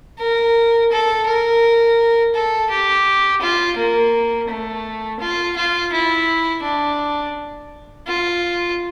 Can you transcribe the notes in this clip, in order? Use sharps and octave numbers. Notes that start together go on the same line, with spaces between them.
A#4
A4
A#4
A4
G4
F4
A#3
A3
F4
F4
E4
D4
F4